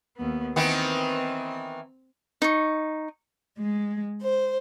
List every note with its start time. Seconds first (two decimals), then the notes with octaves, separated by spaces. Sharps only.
0.17 D#2 B3
0.56 D#3 E3 B3 C4
2.42 D#4 C#6
3.58 G#3
4.21 C5